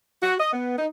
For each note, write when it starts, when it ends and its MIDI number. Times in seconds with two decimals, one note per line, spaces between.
0.23 0.35 66
0.40 0.51 75
0.53 0.77 59
0.79 0.87 63